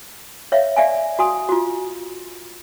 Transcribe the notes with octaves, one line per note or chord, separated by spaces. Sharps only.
C#5 E5 F5
D5 E5 F5 G#5
F#4 G#5 D#6
F4 F#4